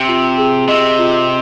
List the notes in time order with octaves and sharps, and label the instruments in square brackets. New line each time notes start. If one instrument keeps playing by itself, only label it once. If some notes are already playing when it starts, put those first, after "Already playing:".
Already playing: [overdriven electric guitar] C3
[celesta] F4
G#4
[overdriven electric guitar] C3 [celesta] D#5
[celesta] F4